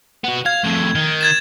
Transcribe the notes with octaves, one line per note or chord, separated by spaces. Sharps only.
B3 F#4
F5 G#6
F2 A2
D#3
G#6 A6 E7